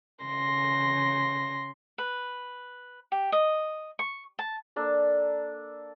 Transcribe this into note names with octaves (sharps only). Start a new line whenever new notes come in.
C#3 C6 A#6
B4
G4
D#5
C#6
A5
A#3 D4 A4